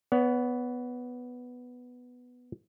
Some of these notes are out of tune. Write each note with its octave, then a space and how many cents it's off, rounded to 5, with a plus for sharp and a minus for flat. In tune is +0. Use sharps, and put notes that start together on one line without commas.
B3 +0 C#5 +35